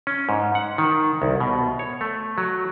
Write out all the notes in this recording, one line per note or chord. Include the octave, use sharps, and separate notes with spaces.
C#4
G#2
F#5
D#3
C2
B2
C#5
A3
F#3